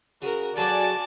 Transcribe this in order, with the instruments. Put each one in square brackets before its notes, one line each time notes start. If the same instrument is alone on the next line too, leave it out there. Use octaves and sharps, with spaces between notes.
[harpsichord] C#3 [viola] F#4 A#4
[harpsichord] C#3 F#3 A4 [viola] F#4 [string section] D5 G#5 [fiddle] A5